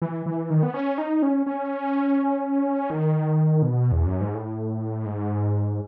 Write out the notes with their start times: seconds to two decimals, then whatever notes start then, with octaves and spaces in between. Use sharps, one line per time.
0.02 E3
0.26 E3
0.50 D#3
0.63 B3
0.74 C#4
0.98 D#4
1.22 C#4
1.46 C#4
2.90 D#3
3.62 B2
3.92 E2
4.06 F#2
4.21 G#2
4.34 A2
5.06 G#2